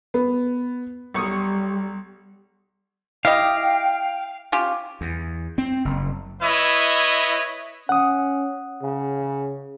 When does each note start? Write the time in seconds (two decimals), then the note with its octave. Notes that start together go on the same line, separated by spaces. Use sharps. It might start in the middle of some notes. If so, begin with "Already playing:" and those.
0.14 B3
1.14 B1 G3 C#6 D#6
3.25 E4 G4 D#5 F5 G5
4.52 C#4 F4 G4
5.01 E2
5.58 C4
5.85 F#1
6.42 E4 B4 C#5 D#5 E5
7.89 C#4 F#5 D#6
8.82 C#3